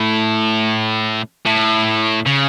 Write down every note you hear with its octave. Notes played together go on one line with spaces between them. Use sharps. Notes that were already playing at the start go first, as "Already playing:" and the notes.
Already playing: A2
A2
C#3